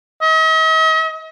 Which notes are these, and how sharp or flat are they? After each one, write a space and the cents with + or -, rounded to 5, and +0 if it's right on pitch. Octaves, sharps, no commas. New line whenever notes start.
D#5 +45